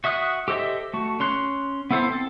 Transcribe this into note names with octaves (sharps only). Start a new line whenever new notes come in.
F#4 E5 D#6 F#6
G4 A4 C5 D#5 E5
A3 F#4
C#4 C6 F#6
B3 E4 A4 C5
C4 A4